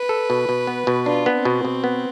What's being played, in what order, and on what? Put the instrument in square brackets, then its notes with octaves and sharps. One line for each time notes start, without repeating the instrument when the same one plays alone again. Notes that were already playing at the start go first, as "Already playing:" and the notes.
Already playing: [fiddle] B4
[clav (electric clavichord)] A4
B2
B2
B3
B2
[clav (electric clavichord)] D4 [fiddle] F4
[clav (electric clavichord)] B3
[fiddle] C4
[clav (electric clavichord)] B2
B2
B3